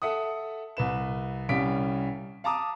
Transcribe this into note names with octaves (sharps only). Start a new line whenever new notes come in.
A4 E5 F#5 D#6
C2 B4 E7
C2 G3 C#4 F5 B6 D7
F5 A5 A#5 D6 D#6